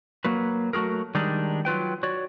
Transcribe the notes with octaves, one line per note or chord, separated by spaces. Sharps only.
F#3 A#3 F#4 B4
F#3 A3 F#4 G#4 A#4
D#3 G3 G#3 D4 D#4
F#3 F4 B4 G5
F#4 C#5 D5